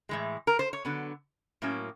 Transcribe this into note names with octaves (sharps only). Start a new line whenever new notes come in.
A2 E3 G#3
A#4
C5
C#5
D3 F#3 B3
A2 F#3 A#3 C#4